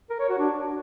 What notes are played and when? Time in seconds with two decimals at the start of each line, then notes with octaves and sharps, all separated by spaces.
0.10 A#4
0.19 C#5
0.29 F#4
0.39 D4